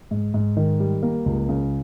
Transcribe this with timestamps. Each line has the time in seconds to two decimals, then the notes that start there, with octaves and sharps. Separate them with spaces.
0.11 G#2
0.34 G#2
0.57 D#3
0.80 G3
1.03 A#3
1.26 C#2
1.49 C#3